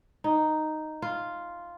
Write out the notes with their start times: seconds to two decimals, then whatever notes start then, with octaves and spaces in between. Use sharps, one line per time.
0.24 D#4
1.02 F4